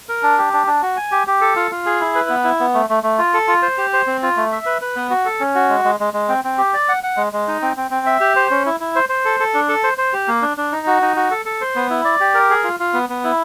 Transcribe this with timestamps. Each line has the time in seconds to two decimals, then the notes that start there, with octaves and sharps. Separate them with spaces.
0.09 A#4
0.23 D4
0.38 G4
0.53 D4
0.67 D4
0.82 F#4
0.97 G#5
1.12 G4
1.27 G4
1.41 A4
1.56 F4
1.71 F4
1.86 G#4
2.01 E4
2.15 B4
2.29 B3
2.44 E4
2.60 B3
2.74 A3
2.90 A3
3.03 A3
3.18 F4
3.34 A4
3.48 F4
3.62 C5
3.78 G4
3.93 C5
4.07 C4
4.23 F4
4.37 A3
4.52 E5
4.66 B4
4.81 B4
4.96 B3
5.10 F#4
5.25 A4
5.40 C#4
5.55 F#4
5.69 G#3
5.85 G#3
6.00 G#3
6.14 G#3
6.29 C4
6.44 C4
6.58 G4
6.74 D5
6.89 F#5
7.03 F#5
7.17 G#3
7.33 G#3
7.48 D#4
7.62 C4
7.77 C4
7.91 C4
8.06 E5
8.20 G4
8.36 C5
8.51 C#4
8.66 E4
8.80 E4
8.96 C5
9.09 C5
9.25 A4
9.40 A4
9.54 D4
9.69 A4
9.84 C5
9.98 C5
10.13 G4
10.28 A#3
10.42 D4
10.57 D4
10.72 D#4
10.87 F#4
11.02 D#4
11.17 F#4
11.31 A4
11.46 A4
11.61 C5
11.76 B3
11.90 E4
12.05 D5
12.20 G4
12.34 A#4
12.50 G#4
12.64 F4
12.80 F4
12.93 B3
13.09 B3
13.24 E4